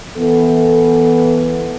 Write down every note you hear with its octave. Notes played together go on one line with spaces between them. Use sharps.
E3 B3 A4